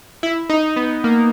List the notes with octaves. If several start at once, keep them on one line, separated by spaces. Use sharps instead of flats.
E4
D#4
B3
A#3